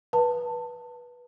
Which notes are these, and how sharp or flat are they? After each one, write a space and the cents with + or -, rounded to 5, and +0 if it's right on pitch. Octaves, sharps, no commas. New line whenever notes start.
B4 -15 A5 +20